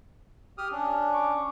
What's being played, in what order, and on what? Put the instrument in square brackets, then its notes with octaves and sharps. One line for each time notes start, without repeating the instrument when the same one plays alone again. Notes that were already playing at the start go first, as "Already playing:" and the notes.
[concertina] G4 D#6 F6
C#4 D4
[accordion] C#6 D6